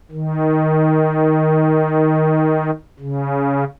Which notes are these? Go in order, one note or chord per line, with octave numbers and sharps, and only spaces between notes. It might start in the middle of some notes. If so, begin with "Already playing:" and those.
D#3
C#3